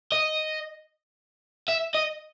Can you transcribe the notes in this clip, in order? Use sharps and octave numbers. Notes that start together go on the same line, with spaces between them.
D#5
E5
D#5